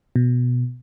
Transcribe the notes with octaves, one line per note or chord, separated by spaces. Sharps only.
B2